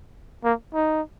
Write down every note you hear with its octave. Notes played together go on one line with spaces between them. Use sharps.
A#3
D#4